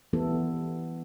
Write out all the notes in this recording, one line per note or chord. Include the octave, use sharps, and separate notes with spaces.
E3 G3 B3 E4 A4